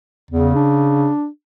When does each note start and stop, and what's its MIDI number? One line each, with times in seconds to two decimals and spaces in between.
0.31 0.55 40
0.31 1.09 49
0.55 1.27 62